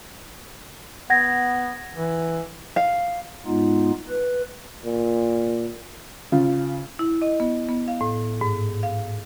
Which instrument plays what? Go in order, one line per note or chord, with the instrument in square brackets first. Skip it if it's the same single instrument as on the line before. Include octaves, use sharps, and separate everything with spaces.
[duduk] B3 [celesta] F#5 G#6 A#6
[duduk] E3
[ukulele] F5
[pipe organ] G#2 G#3 B3 D#4 F4
B4
[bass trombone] A#2
[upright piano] C#3 F4
[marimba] E4
D#5
B3
B3
F5
A2
G#2
F5